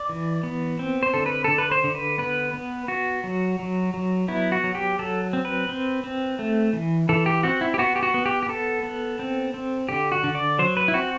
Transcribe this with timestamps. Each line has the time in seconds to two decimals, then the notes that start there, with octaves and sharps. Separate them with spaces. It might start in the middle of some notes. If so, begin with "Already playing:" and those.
Already playing: D5
0.09 E3
0.43 B3
0.79 C4
1.03 C5
1.14 D3 A4
1.26 B4
1.44 D3 A4
1.58 B4
1.71 C5
1.84 D3
1.95 B4
2.18 B3 B4
2.54 B3
2.88 B3 F#4
3.24 F#3
3.59 F#3
3.94 F#3
4.28 B3 E4
4.52 F#4
4.64 F#3
4.75 G4
4.99 F#3 A4
5.33 C4
5.45 B4
5.69 C4
6.04 C4
6.39 A3
6.73 E3
7.09 E3 A4
7.26 G4
7.43 C4 F#4
7.61 E4
7.74 G4
7.78 B3 F#4
7.96 G4
8.03 F#4
8.14 B3
8.26 G4
8.43 G4
8.49 B3 A4
8.83 B3
9.19 C4
9.54 C4
9.89 D3 G4
10.12 F#4
10.24 D3
10.35 D5
10.59 F#3 C5
10.77 B4
10.88 E4
10.94 C4 F#4